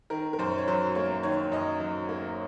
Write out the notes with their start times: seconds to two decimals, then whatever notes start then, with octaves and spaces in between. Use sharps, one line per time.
0.10 D#3 A#4
0.33 A#4
0.39 F#2 C5
0.58 C#5
0.68 F#3 C5
0.95 A#3 C#5
1.23 D#3 C#5
1.52 F#2 D#5
1.80 F#3
2.09 A#3